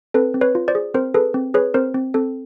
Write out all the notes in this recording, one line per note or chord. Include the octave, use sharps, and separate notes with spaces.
C4 A4 B4
C4
B4 C#5
F4
C5 D5
G#4
C4 A#4 C5
G#4 A4 B4
C4
G#4 B4 C#5
C4 A#4 C5
C4
C4 A4